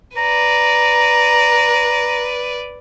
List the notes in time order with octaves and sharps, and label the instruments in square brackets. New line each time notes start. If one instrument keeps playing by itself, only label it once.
[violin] B4 D5 [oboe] A#5